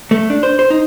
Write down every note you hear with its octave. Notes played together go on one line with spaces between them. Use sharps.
A3
D4
C5
C5
D#4